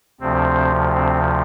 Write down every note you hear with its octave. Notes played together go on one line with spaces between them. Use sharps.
D2 C3 F3 C4
C4